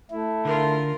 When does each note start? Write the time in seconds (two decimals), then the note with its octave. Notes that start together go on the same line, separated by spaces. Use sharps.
0.11 A3 E4
0.45 D3 F4 A#4